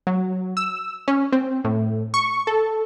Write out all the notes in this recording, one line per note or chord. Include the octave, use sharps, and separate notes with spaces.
F#3
E6
C#4
C4
A2
C#6
A4